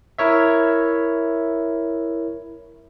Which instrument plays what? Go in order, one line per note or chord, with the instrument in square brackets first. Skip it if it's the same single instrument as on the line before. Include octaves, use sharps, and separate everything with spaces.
[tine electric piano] E4 A#4 C#5 E5